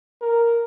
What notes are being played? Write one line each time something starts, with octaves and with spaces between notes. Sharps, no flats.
A#4